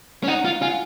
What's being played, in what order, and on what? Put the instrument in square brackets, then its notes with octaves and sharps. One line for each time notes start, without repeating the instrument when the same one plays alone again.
[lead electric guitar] C#4
[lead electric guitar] D#4 [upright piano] F#5
[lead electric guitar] F4
[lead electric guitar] F4 [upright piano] G#5